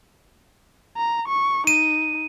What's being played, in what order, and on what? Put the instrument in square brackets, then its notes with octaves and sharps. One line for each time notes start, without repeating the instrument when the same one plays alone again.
[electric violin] A#5
C#6
[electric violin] D#4 [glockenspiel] D#7